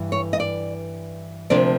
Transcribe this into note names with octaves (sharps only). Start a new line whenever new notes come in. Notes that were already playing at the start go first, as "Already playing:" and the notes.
Already playing: G2 E3
C#5
D#5
D5
D2 C3 F3 A#3 D4 D5